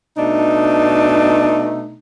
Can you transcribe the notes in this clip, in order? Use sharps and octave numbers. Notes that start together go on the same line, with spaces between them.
B2 A3 D4 D#4